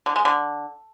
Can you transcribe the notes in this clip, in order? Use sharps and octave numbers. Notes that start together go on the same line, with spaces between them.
D3
G#3
D3